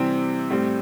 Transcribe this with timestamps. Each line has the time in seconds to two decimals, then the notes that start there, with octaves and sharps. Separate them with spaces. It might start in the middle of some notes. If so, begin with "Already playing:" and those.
Already playing: C3 E3 G3 C4
0.50 A2 G3 C4